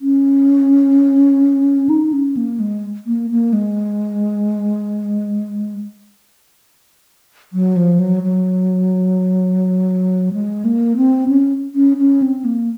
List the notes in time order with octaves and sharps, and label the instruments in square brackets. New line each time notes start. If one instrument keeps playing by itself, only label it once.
[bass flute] C#4
D#4
C#4
A#3
G#3
A#3
A#3
G#3
F#3
F3
F#3
F#3
G#3
A#3
C4
C#4
C#4
C#4
C4
A#3